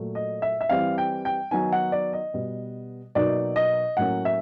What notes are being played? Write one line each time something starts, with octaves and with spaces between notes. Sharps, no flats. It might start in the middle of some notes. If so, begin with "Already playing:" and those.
Already playing: A#2 F#3 A3
D#5
E5
E5
E3 G3 C4 F5
G5
G5
D#3 F#3 B3 D#4 G#5
F#5
D5
D#5
B2 G3 B3
B2 F#3 A#3 D#4 D5
D#5
A2 F#3 A#3 C#4 F#5
E5